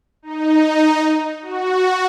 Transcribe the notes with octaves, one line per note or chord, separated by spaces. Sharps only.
D#4
F#4